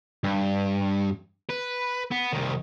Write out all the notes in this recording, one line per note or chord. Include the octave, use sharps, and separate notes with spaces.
G2
B4
B3
C2 D#3